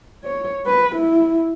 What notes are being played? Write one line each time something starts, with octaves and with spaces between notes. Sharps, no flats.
C#5
B4
E4